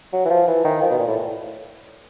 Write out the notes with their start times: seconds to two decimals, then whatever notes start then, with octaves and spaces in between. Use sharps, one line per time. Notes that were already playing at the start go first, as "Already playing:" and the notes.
0.13 F#3
0.25 E3
0.30 F3
0.48 E3
0.65 D#3
0.82 F3
0.91 B2
0.99 A#2
1.08 A2